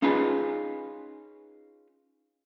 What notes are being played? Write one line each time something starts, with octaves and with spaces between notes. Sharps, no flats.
C#4 D#4 F4 G#4 B4